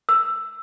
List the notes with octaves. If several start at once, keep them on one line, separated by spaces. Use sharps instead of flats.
E6